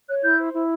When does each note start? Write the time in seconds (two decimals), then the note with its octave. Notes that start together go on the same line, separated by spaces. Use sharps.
0.08 C#5 F#6
0.23 E4 G6
0.39 C5
0.54 E4